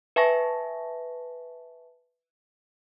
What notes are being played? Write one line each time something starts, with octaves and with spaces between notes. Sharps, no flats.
B4 E5 G#5 A5 C#6 A#6